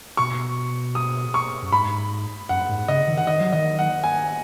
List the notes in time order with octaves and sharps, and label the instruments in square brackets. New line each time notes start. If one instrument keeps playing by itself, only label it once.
[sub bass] B2 [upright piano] C#6
[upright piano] D#6
C#6
[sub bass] F#2
[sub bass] G#2 [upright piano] B5
[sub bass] F#2 [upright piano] F#5
[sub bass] G#2
[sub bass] C#3 [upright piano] D#5
[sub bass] D#3
[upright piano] F#5
[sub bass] D#3 [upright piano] D#5
[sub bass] F#3
[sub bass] D#3 [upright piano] D#5
[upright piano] F#5
G#5